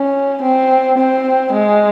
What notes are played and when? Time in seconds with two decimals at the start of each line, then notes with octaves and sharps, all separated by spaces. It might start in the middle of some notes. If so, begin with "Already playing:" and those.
Already playing: C#4
0.42 C4
0.98 C4
1.53 G#3